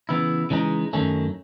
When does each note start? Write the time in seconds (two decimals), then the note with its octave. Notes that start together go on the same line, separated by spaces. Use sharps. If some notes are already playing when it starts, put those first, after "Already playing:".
0.09 C#3 E3 B3 E4
0.50 C#3 E3 G#3 D#4
0.93 F#2 D#3 A3 C#4